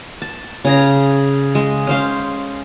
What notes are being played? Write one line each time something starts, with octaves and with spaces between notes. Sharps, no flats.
A5
C#3 G#4 A#5
G#3
C#4 C5 F5